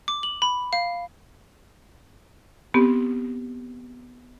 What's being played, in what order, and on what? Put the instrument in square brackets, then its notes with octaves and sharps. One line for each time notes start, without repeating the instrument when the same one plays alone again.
[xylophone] D6
F#7
B5
F5
[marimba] B3 C4 G4